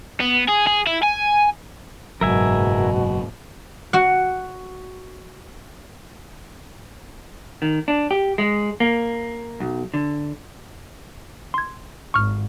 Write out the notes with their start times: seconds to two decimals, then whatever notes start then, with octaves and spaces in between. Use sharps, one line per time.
0.20 B3
0.49 G#4
0.67 G#4
0.87 E4
1.03 G#5
2.21 F#1 G#2 B2 F#3 A#4 E5 G#5
3.93 F#4 F#5
7.62 D#3
7.88 D4
8.11 G4
8.38 G#3
8.80 A#3
9.60 B1
9.94 D3
11.54 C6 G#6
12.14 G#1 C#6 F6